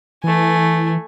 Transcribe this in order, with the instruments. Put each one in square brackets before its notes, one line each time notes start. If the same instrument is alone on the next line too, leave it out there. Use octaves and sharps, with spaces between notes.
[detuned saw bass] E3 [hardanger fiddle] A3 G#5